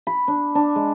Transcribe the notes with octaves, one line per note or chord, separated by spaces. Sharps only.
B5
D4
D4
G#3